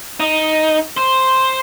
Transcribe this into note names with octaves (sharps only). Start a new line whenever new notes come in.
D#4
C5